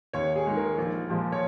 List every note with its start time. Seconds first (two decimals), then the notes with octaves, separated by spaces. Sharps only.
0.13 D#2 C#5
0.36 G#4
0.46 D#3 G#3
0.57 A#4
0.78 A#1
1.09 A#2 F3 G#3
1.32 C#5